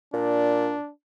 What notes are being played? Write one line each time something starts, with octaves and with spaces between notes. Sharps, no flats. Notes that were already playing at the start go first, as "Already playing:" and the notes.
A#2 D4